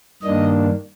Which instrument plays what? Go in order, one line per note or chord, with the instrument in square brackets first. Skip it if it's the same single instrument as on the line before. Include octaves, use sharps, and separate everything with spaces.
[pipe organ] G2 D#3 A#3 D4 D#5